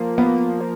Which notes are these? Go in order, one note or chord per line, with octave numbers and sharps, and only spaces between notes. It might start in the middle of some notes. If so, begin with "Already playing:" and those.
Already playing: F3 A#3
A#3 B3
F3